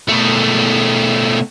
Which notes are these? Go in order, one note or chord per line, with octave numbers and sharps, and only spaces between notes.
B2 A3